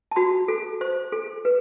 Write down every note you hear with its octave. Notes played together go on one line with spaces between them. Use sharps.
A5
F#4 B5
A4
C5
A4
B4